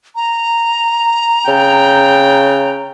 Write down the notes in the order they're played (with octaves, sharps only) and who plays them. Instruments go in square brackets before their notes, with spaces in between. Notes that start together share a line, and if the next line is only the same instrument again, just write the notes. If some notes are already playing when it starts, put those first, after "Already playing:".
[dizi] A#5
[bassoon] C#3 [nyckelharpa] G5